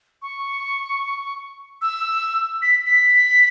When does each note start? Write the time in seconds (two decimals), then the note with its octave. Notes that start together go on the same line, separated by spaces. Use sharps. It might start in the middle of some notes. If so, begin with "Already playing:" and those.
0.22 C#6
1.82 E6
2.62 B6
2.86 B6